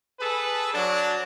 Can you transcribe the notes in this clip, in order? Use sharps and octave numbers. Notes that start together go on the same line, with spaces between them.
G#4 A4 B4
F#3 D4